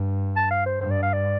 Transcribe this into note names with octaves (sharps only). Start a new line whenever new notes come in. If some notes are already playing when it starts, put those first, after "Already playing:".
Already playing: G2
A5
F5
C5
G2 C5
D5
F5
D5